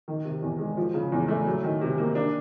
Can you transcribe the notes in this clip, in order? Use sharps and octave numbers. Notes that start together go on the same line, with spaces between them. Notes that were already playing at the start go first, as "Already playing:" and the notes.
D#3
C3
E2
G#3
F3
C#3
E2
A3
F#3
D#3
C3
A#3
D4